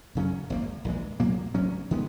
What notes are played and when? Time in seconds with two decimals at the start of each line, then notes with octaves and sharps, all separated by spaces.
0.15 F#2 C#3 F#3 C#4
0.50 G#1 F#2 D#3 A#3
0.85 A#1 G#2 E3 G#3
1.20 B1 A#2 F#3 A#3
1.54 G#1 G#2 F#3 C#4
1.91 D#3 G#3 B3